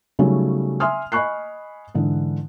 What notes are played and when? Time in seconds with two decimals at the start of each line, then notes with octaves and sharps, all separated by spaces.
0.19 C#3 F#3 G3 A3 C#4 D#4
0.80 E5 G#5 C6 D#6 F6
1.12 D#5 G#5 B5 C#6 F#6 C7
1.95 G#2 D3 E3